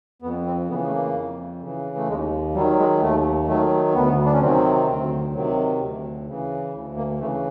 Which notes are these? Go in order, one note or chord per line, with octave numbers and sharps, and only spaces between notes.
F2 B3
C4
C#3 E3 B3
A3
A#3
F2
C#3 E3
A3
D#2 G#3
D#3 F#3 G3
G#3
D#2 A3
D#3 F#3 A3
D2 B3
D4
C#4
C3 D#3 F#3 C4
D2
C3 D#3 F#3
D2
C#3 E3
D2
A#3
C#3 E3 A3